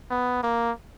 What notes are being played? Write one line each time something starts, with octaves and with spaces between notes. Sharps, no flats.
B3
A#3